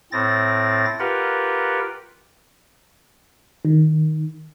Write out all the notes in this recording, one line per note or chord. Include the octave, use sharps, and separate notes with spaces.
A2 C4 A6 A#6
F4 G4 A#4 B4 F#5
D#3